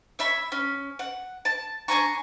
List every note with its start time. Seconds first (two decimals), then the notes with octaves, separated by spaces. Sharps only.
0.19 C#5 E5 B5
0.52 C#4
0.99 F#5
1.45 A5
1.88 D4 G#5 A#5 C#6